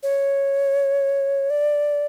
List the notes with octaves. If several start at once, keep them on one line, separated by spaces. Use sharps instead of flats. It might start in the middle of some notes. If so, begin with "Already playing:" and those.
C#5
D5